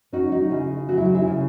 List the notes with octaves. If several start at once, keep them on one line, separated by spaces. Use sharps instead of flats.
C#4 D#4 F#4
D#4 F#4
C#3 E4
F#3 F#4
E4
D#4 F#4
E4 G#4
C#3